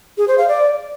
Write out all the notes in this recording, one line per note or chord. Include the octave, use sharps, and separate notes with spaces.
G#4
C5
F5
D5